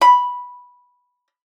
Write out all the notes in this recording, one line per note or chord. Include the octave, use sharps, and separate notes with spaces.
B5